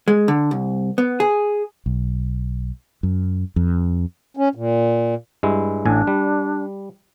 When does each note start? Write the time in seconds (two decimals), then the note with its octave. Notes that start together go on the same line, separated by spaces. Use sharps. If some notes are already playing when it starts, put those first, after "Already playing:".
0.08 G#3
0.28 D3
0.51 C2
0.98 B3
1.20 G#4
1.86 B1
3.03 F#2
3.56 F2
4.37 C#4
4.55 A#2
5.43 G2 G#3 E4
5.85 A1 A2 D4 G#5
6.07 G3